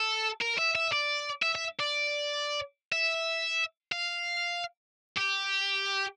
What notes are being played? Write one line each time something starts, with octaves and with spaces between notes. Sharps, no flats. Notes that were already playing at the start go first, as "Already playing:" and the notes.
Already playing: A4
A#4
E5
E5
D5
E5
E5
D5
E5
F5
G4